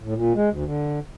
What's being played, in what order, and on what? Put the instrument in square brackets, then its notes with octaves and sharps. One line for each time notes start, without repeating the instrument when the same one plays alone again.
[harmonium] A2
A#2
G#3
D2
D3